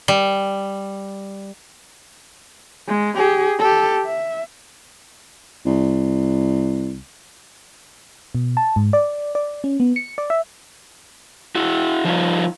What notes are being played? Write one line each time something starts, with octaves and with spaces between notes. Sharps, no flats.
G3
G#3
G4 G#4
G4 A4
E5
C2
B2
A5
G#2
D5
D5
C#4
B3
C#7
D5
E5
E4 F#4
F3 G3 D#4 F4